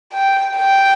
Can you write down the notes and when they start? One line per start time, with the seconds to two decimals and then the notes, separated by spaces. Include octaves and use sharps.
0.14 G5
0.56 G5